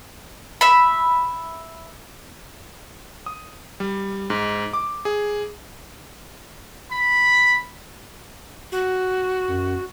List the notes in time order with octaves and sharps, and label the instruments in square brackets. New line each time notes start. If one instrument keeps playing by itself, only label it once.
[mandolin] E5 B5
[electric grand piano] D#6
G3
G#2
D6
G#4
[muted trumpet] B5
[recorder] F#4
[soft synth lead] F#2